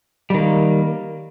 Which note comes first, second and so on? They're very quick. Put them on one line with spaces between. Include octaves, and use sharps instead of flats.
G3 D#3 A#3